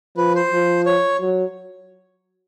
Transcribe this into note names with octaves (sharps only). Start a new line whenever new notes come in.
F3 B4
C5
F3
C#5
F#3